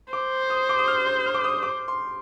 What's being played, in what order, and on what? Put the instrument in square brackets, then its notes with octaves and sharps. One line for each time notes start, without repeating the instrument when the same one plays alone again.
[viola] C5 [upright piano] D6
[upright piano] D#6
D6
D#6
F6
G6
F6
D6
D#6
D6
C6